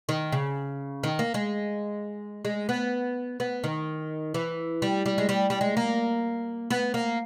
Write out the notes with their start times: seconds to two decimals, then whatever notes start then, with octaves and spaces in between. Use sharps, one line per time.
0.09 D#3
0.32 C#3
1.03 D#3
1.19 A#3
1.34 G#3
2.45 G#3
2.69 B3
3.40 B3
3.64 D#3
4.34 E3
4.82 G3
5.06 G3
5.18 G#3
5.29 G3
5.50 G3
5.61 G#3
5.77 A#3
6.70 B3
6.94 A#3